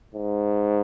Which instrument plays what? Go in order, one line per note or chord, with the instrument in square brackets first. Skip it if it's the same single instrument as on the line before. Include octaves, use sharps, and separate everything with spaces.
[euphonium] G#2